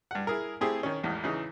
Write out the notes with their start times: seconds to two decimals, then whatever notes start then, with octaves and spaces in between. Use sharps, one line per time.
0.11 G2 F#5
0.27 E4 G#4 A#4
0.61 A3 C4 E4 G4 G#4
0.83 D#3 C#4
1.03 A1 E2 G#2
1.24 C#3 E3 D#4